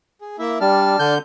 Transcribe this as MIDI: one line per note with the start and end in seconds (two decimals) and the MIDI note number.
0.21 0.36 68
0.39 0.58 58
0.39 0.58 64
0.39 0.58 76
0.61 0.96 55
0.61 1.14 62
0.61 1.14 81
0.61 1.14 89
0.99 1.18 50
0.99 1.18 91